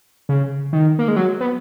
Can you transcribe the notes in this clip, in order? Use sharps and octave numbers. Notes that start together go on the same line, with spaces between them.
C#3
D#3
A#3
G#3
F#3
B3